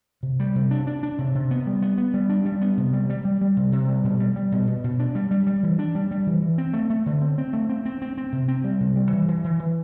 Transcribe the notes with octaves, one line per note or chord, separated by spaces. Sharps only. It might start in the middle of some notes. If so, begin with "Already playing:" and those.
C3
G3
C3
D4
D4
D4
C3
C3
B3
G3
B3
B3
G3
D4
G3
B3
C3
G3
G3
G3
G3
C3
C3
G3
B2
G3
G3
B2
B2
B2
D4
G3
G3
G3
E3
D4
G3
G3
E3
E3
C4
A3
A3
D3
C4
C4
A3
C4
C4
C4
C4
C3
C4
G3
C3
G3
E3
E3
E3
E3